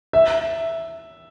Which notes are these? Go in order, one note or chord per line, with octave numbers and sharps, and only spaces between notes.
E5